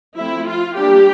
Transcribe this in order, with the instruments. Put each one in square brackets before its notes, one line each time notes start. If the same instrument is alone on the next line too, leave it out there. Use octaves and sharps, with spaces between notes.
[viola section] F3 A3 C4 E4
F4
G3 A#3 D4 G4